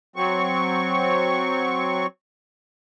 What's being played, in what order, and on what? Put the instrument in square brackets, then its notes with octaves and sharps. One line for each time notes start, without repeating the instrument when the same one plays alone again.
[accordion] F#3 C4 C#6